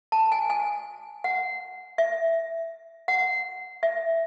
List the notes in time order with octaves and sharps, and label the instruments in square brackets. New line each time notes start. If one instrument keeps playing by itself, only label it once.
[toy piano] A5
G#5
G#5
F#5
E5
F#5
E5